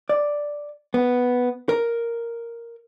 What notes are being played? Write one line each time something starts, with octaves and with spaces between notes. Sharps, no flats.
D5
B3
A#4